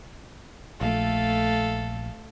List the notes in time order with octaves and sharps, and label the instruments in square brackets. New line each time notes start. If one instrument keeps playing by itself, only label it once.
[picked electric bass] A#1 [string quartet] A3 A4 F5